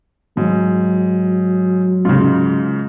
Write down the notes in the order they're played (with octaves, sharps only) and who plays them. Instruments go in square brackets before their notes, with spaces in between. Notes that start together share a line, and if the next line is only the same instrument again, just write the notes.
[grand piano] G#2 [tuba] F#3
[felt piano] G#2 C#3 [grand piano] F4